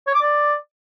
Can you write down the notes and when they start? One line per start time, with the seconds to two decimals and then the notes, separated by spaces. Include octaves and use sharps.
0.07 C#5
0.14 D6
0.22 D5